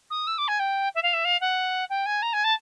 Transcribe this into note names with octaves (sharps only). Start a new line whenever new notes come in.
D#6
E6
D6
G#5
G5
E5
F5
E5
F5
F#5
G5
G#5
A#5
G#5
A5